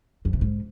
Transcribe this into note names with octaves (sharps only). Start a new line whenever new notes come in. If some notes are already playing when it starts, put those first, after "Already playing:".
F2
C3
G#2